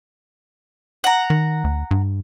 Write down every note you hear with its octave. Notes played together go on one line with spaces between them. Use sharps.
F#5 A#5
D#3
D2
G2